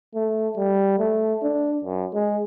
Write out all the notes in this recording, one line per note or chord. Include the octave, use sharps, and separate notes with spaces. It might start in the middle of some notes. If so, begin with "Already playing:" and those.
A3
G3
A3
D4
F#2
G#3